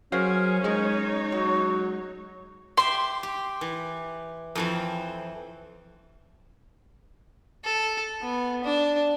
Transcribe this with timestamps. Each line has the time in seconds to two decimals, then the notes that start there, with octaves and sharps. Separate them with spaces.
0.12 F#3 C#4 G#4 A#4 C5 F5
0.64 G#3 D#4 C#5
1.32 F#3 F#4
2.77 G4 E5 G5 C6
3.23 G4
3.61 E3
4.55 F2 E3 C4
7.64 A4
8.21 B3
8.64 D4